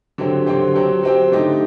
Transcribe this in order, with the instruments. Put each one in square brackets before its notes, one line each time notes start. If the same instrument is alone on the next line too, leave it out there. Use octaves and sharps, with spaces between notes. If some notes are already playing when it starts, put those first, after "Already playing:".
[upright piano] D3 F#3 C4 G4
D3 F#3 C4 G4
F#3 C4 G4
F#3 C4 G4
D3 A3 D#4 G4